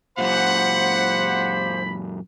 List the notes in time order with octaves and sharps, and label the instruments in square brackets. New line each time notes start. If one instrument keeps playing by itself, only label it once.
[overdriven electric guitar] F#2 A#2 [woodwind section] F4 G4 C5 [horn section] F#5 [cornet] B5